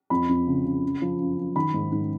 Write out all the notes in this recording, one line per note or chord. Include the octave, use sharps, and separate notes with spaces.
F2 B5
F2
C#3
C#3
F#2
F3
F#2
F#2
D#3 B5
G#2
G#2